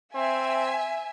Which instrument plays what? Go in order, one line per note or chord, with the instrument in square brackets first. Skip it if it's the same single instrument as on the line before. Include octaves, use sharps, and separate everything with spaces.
[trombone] C4 [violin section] E5 G#5